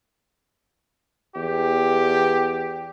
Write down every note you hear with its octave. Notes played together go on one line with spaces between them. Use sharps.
E2 G4